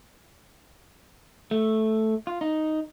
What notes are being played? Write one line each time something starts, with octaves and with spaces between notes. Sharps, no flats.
A3
F4
D#4